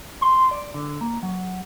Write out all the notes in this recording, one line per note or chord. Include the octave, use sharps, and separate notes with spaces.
C6
D5
D3
A#3
F#3